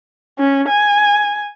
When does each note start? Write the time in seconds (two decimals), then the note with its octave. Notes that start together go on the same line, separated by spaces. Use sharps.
0.39 C#4
0.68 G#5